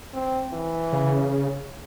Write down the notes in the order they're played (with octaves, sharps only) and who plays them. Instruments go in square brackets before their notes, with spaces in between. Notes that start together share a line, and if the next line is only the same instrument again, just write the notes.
[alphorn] C4
E3
[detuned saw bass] C#3